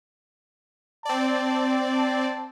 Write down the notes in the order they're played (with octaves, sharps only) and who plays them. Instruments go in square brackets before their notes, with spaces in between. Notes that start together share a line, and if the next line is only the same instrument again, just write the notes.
[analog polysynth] C4 D5 [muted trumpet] A5
[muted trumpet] A5